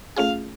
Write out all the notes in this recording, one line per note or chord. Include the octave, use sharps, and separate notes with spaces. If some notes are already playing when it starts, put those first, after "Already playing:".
A3 C#4 F4 G#4 F5